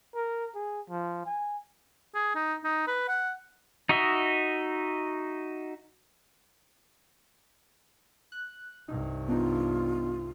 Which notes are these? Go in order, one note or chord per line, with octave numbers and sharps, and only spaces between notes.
A#4
G#4
F3
G#5
G#4
D#4
D#4
B4
F#5
D#4 F#4 D#5 E5
F#6
C2 G2 D#4
B3 D4 D#4 F4